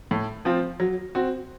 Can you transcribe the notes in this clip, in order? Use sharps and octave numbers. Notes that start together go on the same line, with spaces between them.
A2
F3 C4 F4
F#3
C4 F#4